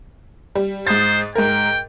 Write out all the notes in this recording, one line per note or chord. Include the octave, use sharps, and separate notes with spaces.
G3
G#2 C5 D#6 A6
G#2 A#4 G5